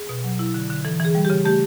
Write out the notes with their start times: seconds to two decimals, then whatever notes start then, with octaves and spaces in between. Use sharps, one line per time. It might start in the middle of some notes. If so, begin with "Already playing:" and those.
Already playing: G#4
0.09 B2
0.24 F#3
0.39 E4
0.54 D3
0.70 D3
0.85 E3 A4
1.00 E3 G#4
1.15 G3
1.25 G4
1.30 C#3
1.45 A3 G4